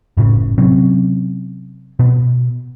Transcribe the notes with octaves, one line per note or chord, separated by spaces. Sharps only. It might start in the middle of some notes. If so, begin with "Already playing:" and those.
F#1 A2 C#3
C3 F#3 C4 C#4
B2